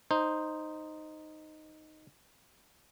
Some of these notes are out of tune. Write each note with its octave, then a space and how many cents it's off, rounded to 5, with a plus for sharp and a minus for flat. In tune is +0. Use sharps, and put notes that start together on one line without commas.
D#4 -5 C5 +0